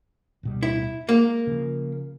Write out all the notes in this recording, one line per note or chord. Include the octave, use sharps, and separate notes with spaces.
D1 B2 G3
E4
G#3 A#3
C#3 F3